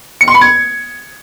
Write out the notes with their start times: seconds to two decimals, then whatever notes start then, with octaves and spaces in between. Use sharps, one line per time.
0.21 C#7
0.28 C6
0.35 B5
0.41 G#6